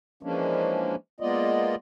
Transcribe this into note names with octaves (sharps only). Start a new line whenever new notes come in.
E3 F3 G#3 A#3 C#4 D4
G#3 A#3 B3 F4 D5 D#5